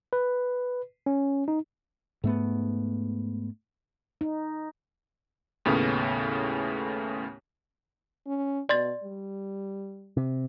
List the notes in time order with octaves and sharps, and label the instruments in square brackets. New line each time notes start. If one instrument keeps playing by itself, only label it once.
[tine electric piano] B4
C#4
D#4
[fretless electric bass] G#2 A3 B3
[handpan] D#4
[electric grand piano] D#2 A2 C#3 A3 B3 C#4
[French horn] C#4
[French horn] B2 [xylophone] D5 C6 A6
[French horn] G3
[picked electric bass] C3